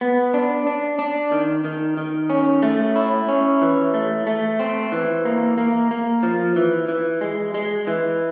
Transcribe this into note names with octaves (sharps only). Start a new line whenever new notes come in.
B3
D4
D4
D4
D#3
D#3
D#3
C#4
A3
E4
C#4
E3
A3
A3
C4
E3
A#3
A#3
A#3
F3
E3
E3
G#3
G#3
E3